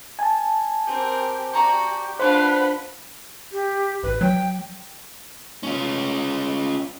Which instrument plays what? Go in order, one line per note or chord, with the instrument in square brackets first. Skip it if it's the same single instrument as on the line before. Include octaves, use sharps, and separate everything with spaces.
[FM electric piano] G#5 A5
[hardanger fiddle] C4 A#4 [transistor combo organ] G4
[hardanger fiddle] F#4 [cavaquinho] D5 A#5 C#6
[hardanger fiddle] D4 F4 [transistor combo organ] B4 F#5 B5 [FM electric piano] C5
[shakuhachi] G4
[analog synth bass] A1 [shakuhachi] B4
[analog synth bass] F#3 [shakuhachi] G5
[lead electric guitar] C#4 F4